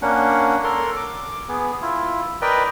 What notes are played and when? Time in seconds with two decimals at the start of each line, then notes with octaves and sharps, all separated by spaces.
0.02 A#3 C#4 D4 F#5
0.64 A4 A#4 C6
0.96 D6
1.49 B3 G#4
1.82 E4 F4
2.42 A#4 B4 D5 D#5 G5